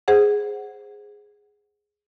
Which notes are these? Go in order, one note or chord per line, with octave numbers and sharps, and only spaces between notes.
G#4 C5 F#5